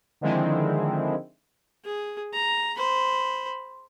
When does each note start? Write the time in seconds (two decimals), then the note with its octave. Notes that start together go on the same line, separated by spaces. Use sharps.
0.21 D3 D#3 F3 G#3 C4 E4
1.85 G#4
2.33 A#5
2.77 C5 B5